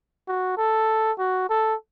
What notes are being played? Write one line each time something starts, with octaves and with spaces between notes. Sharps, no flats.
F#4
A4
F#4
A4